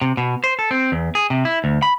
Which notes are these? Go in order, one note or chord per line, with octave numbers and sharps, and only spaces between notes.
C3
B2
C5
A4
C4
E2
G#4
C3
E4
D2
B5